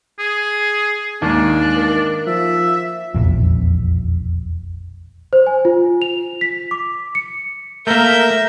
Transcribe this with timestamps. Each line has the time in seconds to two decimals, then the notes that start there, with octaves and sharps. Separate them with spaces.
0.19 G#4
1.22 D#2 G#2 D#3 D4
1.77 A#3
2.27 F3 E5
3.14 E1 A#1 F2
5.33 C5
5.47 G#5
5.65 F4
6.02 F7
6.41 B6
6.71 D6
7.15 C#7
7.87 A3 A#3 A#4 E5 G6